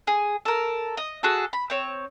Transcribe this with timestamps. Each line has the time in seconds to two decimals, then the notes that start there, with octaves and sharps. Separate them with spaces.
0.07 G#4
0.45 A4 A#4
0.97 D#5
1.23 F#4 G#4 A4
1.53 B5
1.70 C4 C#5